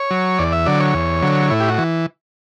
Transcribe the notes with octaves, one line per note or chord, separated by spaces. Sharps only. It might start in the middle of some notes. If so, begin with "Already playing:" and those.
Already playing: C#5
F#3
E2 D5
E5
D3 F#3 D5
C#5
E2
D3 F#3
A2 E4
G4
F#4
E3